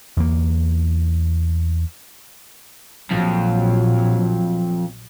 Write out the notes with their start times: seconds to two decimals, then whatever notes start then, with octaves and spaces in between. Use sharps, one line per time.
0.17 E2 A#3
3.11 A#1 F2 F#3